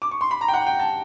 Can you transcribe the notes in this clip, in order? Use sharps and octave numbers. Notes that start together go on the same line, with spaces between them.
D6
C#6
C6
B5
A#5
G5
F#5
G5
A5